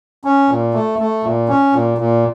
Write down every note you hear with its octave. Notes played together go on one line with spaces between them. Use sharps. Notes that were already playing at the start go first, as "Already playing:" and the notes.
C#4
A#2
A3
A3
A#2
C#4
A#2
A#2